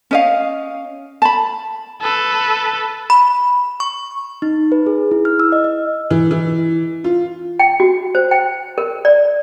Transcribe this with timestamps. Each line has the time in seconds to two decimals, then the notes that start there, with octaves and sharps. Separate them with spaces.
0.11 C#4 D#5 F5
1.22 A5 B5
2.01 A4 B4
3.10 B5
3.80 C#6
4.42 D#4
4.72 B4
4.86 G#4
5.11 E4
5.25 F6
5.40 E6
5.52 D#5
5.64 D#5
6.10 E3
6.31 E3
7.04 F4
7.59 G5
7.80 F#4
8.15 C5
8.31 G5
8.78 A#4
9.05 D5